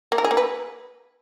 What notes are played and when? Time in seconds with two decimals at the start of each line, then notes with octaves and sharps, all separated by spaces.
0.12 A#3
0.18 A#4
0.24 G#4
0.31 A#3
0.37 B4